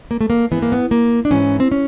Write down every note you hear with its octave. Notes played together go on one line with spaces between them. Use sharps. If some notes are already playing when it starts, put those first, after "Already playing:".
A#3
A3
A#3
G#2 E3 B3
A#3
B3
A#3
D4
G#2 E3 C#4
C4
C#4